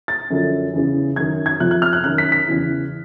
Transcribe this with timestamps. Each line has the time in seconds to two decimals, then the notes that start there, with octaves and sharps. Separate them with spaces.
0.08 A6
0.30 F#2 D3 F3
0.74 E2 C#3 E3
1.16 F#2 D#3 G#6
1.46 G#6
1.60 F2 C3 F3 F#6
1.71 F#6
1.82 F6
1.93 F#6
2.04 F#2 D#3 F#6
2.18 B6
2.32 B6
2.48 E2 C#3 E3